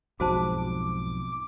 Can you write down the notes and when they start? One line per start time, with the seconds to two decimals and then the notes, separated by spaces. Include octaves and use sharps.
0.20 B1 F2 G#2 F#4 C5 A5 D6